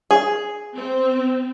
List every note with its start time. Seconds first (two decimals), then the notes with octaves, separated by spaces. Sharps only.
0.11 G#4
0.74 C4